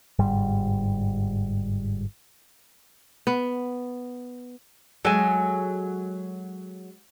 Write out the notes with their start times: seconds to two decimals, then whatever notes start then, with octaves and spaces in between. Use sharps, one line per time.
0.19 G1 G#2 G3
3.27 B3
5.05 F#3 G#3 A4 G#5